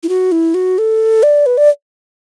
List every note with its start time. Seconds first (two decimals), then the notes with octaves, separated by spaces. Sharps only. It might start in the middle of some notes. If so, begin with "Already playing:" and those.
0.03 E4
0.09 F#4
0.32 E4
0.54 F#4
0.78 A4
1.23 D5
1.46 B4
1.57 D5